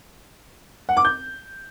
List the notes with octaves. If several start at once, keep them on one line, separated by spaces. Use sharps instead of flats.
F#5
D6
G6